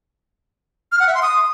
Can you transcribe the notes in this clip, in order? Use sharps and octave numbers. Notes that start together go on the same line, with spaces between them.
F6
F#5
E5
C6
D#6